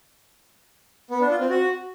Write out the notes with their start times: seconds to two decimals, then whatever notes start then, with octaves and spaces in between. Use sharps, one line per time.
1.11 B3
1.20 D4
1.30 F4
1.40 C4
1.50 F#4